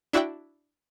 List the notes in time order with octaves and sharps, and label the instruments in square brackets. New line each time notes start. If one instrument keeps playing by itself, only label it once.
[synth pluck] D4 E4 F#4 D5 E5 G5